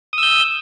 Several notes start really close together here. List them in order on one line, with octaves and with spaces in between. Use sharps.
D#6 E6 G6